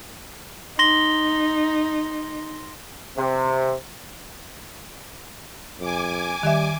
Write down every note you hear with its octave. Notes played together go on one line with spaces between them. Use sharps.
D#4 C6 A#6 G7
C3
F2 G#5 D6
D#3 G3 E5